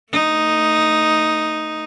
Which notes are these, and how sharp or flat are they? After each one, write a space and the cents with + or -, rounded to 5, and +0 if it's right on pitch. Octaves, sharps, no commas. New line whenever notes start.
A3 +30 D#4 +0